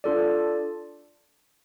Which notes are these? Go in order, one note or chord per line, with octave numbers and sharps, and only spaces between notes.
D4 F4 A4 D5